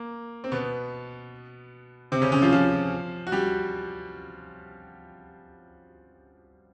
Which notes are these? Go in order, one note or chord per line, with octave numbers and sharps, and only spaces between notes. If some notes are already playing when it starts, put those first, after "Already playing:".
Already playing: A#3
C4
B2 B3
C3 C4
C#3 C#4
C#3 C#4
F3 F4
F3 F4
F#4
G3 G4